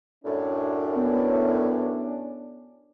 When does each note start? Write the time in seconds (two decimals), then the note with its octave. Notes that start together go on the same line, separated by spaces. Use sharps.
0.25 F#2 A2 C#4 D4
0.97 B3